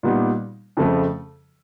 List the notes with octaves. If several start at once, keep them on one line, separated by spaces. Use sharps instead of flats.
A#2 G3 B3 D#4
F2 C#3 F3 A3